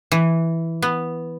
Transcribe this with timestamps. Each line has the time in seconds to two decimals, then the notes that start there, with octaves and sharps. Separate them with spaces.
0.12 E3
0.82 B3